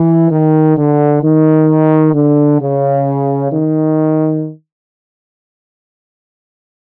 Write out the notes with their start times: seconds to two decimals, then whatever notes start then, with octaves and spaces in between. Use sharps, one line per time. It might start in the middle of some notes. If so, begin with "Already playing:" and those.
Already playing: E3
0.30 D#3
0.77 D3
1.22 D#3
2.14 D3
2.61 C#3
3.52 D#3